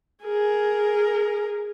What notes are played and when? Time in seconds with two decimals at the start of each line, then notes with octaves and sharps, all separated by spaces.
0.23 G#4 A#4